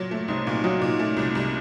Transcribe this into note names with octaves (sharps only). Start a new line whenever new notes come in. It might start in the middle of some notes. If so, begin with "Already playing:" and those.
Already playing: A#2 F#3
A3
C2 C4 D#4
A#2 C#4 F4
F#3 D#4 F#4
A#2
A3
C2
C2